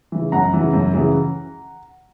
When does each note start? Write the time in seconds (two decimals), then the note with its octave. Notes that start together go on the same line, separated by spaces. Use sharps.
0.12 C#3 E3
0.32 F#2 F#5 A#5
0.54 C#3 E3
0.73 F#2
0.93 C#3 E3